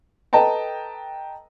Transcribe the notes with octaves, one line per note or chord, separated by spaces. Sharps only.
A4 B4 D#5 G5 A5 A#5